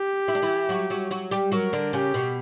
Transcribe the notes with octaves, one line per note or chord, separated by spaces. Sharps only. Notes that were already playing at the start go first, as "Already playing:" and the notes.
Already playing: G4
E4
D4
E3 E4
F#3 F#4
F#3 F#4
F#3 F#4
G3 G4
F#3 F#4 A#4
D3 D4
C#3 C#4 G4
B2 B3